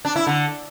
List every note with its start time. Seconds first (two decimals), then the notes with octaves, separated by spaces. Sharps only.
0.05 D4
0.16 E4
0.27 D3